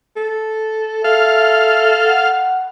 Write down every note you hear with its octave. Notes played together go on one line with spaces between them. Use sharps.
A4
A4 E5 F5
F#5